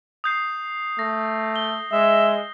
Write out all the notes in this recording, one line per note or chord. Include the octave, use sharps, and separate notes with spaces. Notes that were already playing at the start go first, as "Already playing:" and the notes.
D#6 G6 C7
A3 A#6
G7
G#3 E5